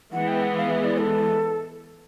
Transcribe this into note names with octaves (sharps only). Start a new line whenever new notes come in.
E3 G#3 B3 F#5
G5
F#5
F5
E5
D5
A4